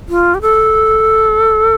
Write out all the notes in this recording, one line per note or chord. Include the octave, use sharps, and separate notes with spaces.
F4
G4
A4